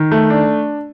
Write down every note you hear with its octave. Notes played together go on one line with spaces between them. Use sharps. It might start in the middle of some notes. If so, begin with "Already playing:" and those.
Already playing: D#3
A3
D4